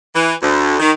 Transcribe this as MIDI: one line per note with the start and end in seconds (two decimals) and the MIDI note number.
0.14 0.34 52
0.42 0.75 38
0.80 0.91 51